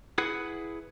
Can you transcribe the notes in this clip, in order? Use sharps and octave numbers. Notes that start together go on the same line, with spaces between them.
E4 G#4 B4 F#5